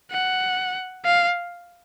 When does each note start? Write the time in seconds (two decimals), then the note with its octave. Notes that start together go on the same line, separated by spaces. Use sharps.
0.12 F#5
1.05 F5